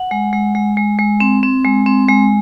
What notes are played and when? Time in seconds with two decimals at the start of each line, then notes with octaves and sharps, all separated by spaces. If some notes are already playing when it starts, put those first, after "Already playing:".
Already playing: F#5
0.11 G#3
0.33 G#3
0.55 G#3
0.77 G#3
0.99 G#3
1.20 C4
1.43 C4
1.65 G#3
1.86 C4
2.08 G#3